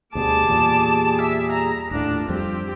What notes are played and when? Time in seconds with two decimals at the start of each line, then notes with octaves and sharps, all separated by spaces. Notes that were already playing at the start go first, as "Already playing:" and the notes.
0.15 D2 B2 G3 G#4 A5 D6
0.47 E2 A#2
1.22 E5
1.52 A#5
1.91 D#1 A2 D4 F4
2.29 F2 G3 C4 G4